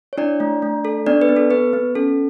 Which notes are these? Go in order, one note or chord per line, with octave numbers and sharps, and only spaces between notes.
C#5
D4 E4 D5
A3
A3
A4
B3 D4 D5
B4
B3
A4
B3 B4
B3
C#4 A4